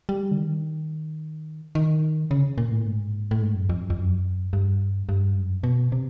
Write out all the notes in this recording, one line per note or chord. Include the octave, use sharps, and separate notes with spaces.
G3
D3
D#3
D#3
C#3
A#2
A2
G#2
A2
G#2
F#2
F2
F#2
F2
F#2
G2
G2
F#2
B2
C3